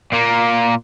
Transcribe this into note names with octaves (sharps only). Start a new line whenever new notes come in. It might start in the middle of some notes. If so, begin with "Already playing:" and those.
A#2 A#3